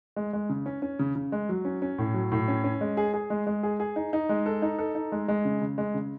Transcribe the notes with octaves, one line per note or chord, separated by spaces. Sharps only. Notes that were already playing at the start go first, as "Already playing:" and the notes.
G#3
G#3
C#3
C#4
C#4
C#3
C#3
G#3
F#3
C#4
C#4
A2
F#3
A2
C#4
C#4
G#3
G#4
G#4
G#3
G#3
G#4
G#4
D#4
D#4
G#3
A4
D#4
A4
D#4
G#3
G#3
C#3
C#3
G#3
C#3